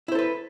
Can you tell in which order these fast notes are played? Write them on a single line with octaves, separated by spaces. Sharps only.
E4 C5 A4 B4